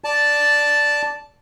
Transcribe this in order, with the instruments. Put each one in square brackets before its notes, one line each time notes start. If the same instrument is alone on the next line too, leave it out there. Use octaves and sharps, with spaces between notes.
[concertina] D5 A5